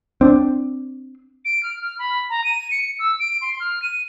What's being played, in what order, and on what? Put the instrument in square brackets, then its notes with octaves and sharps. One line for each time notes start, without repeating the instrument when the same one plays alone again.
[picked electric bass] C4 D4
[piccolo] D7
F6
F6
B5
A#5
D#7
C#7
E6
D7
C6
F6
D#7